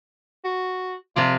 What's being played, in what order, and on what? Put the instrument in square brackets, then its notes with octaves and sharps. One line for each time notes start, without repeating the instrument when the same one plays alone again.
[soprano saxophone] F#4
[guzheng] C3 F3 D5 [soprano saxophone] F4